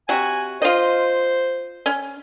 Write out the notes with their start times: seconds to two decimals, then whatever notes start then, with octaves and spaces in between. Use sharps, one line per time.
0.09 C3 F#4 G#5
0.62 F4 C5 D#5
1.86 C#4